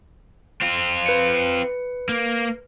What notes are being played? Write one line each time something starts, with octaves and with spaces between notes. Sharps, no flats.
C4 F4
B4 C#7
A#3